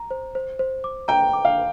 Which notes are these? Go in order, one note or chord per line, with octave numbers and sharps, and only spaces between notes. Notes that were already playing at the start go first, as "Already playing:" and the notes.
Already playing: A#5
C5
C5
C5
D6
G5 A#5
D6
F5